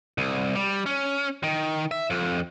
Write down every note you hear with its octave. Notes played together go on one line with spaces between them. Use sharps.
C2
G3
C#4
D#3
E5
F2